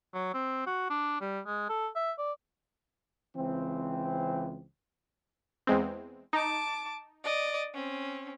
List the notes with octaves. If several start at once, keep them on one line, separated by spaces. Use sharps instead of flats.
F#3
C4
F#4
D4
G3
G#3
A4
E5
D5
C#2 E3 C4
E2 G#3 C4
D#4 A5 D6
D5 D#5
C4 C#4